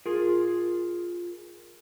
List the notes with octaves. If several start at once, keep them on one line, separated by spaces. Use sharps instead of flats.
F4 G#4 A#4